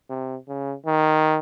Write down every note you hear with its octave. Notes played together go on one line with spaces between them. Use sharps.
C3
C#3
D#3